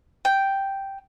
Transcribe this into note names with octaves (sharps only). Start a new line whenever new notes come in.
G5